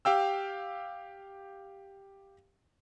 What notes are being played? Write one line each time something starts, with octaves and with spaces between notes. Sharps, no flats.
G4 F5 G5 E6